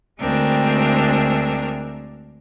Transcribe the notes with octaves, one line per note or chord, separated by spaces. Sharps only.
D2 G#3 C4 D4 A#4 E6